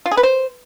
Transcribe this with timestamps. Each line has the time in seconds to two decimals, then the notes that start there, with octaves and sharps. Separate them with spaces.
0.06 F4
0.11 G#4
0.17 B4
0.23 C5